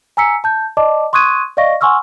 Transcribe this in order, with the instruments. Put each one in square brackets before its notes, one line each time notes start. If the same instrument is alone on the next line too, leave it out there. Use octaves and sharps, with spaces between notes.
[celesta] G#5 A#5 E6 B6 C#7
A5 G6
D5 D#5 A5 D6
C6 C#6 D#6 F#6 G#6 D#7
D5 D#5 F5 C#6 A#6
F#5 G#5 C6 C#6 E6 F6